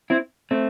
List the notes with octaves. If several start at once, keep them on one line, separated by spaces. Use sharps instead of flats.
C4 E4
A3 C4